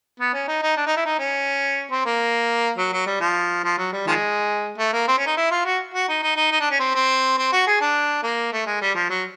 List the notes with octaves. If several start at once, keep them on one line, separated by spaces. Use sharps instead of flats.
B3
C#4
D#4
D#4
D4
D#4
E4
D#4
C#4
C4
A#3
F#3
F#3
G3
F3
F3
F#3
G3
D#3 F3 G#3
A3
A#3
C4
C#4
D#4
E4
F4
F#4
F#4
D#4
D#4
D#4
D#4
D4
C#4
C4
C4
C4
F#4
G#4
D4
A#3
A3
G#3
G3
F3
F#3